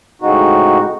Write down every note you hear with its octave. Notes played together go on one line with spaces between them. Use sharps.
A2 C#3 G#3 C4 D#4 F#4